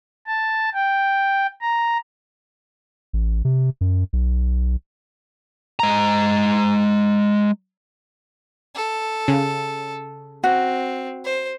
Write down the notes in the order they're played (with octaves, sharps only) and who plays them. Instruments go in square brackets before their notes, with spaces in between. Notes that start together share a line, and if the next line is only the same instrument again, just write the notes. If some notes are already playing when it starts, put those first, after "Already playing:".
[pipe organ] A5
G5
A#5
[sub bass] A1
C3
F#2
B1
[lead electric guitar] G#3 A#5
[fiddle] A4
[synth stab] C#3
[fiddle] C4 [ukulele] F#4
[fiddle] C5